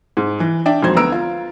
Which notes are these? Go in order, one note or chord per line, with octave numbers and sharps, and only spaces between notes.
G#2
E3
D4 E5 G5
G#1 F2 F#3 C5 G#6
D2 B3 A#5 E6 D7
F4